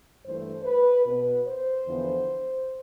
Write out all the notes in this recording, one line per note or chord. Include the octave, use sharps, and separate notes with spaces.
G2 E3 A3 C5
B4
B2 B3 B4
C5
E2 D3 F3 B3